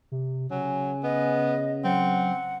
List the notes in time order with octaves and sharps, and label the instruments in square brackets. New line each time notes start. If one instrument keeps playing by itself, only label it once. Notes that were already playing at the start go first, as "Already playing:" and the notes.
[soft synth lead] C3
[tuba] C#3 [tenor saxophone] F#3 [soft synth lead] G#5
[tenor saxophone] B3 [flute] D#5
[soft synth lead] F#3 [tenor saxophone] C4 [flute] F#5